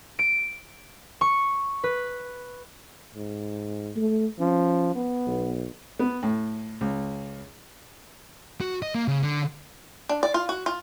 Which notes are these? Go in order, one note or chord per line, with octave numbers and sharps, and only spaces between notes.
D7
C#6
B4
G#2
A3
F3 C#4
B3
B1
B3
A2
C#2
F#4
D#5
A#3
C#3
D3
D4
D5
F4
F#4
F4